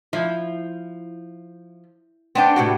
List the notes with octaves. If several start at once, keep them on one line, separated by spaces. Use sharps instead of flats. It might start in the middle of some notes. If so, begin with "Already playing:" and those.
F3 E4
B3 C4 D4 G5
A2 C3 F#4